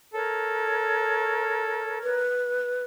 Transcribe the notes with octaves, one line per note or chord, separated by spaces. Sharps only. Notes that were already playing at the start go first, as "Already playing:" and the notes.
A4 A#4 C#5
B4